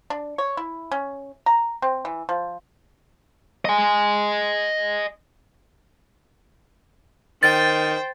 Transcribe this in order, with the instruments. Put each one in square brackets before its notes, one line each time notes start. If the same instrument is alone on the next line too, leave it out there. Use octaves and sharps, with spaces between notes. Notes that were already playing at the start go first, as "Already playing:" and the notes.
[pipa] D4
C#5
E4
C#4
A#5
C4
E3
F3
[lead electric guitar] D#5 G#5
[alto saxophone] D#3 [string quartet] C5 [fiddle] G5 [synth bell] A6